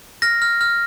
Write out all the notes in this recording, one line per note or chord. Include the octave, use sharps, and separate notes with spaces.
F6 A#6
F6
F6